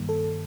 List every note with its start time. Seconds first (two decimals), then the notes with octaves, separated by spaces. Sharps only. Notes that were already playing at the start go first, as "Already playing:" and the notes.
Already playing: G2 D#3 G3 A#3
0.09 A4